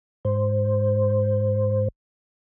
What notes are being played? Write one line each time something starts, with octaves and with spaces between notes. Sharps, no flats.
G#2 C5